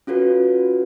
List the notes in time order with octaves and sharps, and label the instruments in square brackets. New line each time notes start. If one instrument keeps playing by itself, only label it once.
[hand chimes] C#4 F4 F#4 A4 B4